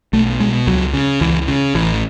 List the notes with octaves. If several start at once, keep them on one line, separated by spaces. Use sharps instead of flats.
B1 A3
B2 G#3
C#2 F#3
C#3
C#2 E3
C#3
A1 E3